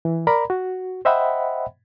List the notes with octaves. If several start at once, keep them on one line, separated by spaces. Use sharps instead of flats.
E3
A#4 D5 A#5 B5
F#4
C5 D#5 E5 F#5 G5 B5